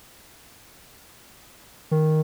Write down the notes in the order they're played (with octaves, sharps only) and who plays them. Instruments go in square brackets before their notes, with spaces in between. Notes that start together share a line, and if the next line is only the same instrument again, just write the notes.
[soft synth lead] D#3